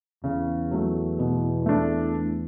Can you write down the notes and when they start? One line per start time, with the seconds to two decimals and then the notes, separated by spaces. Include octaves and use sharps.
0.24 E2 C#3
0.71 F#3 A3
1.19 B2
1.66 A3 D4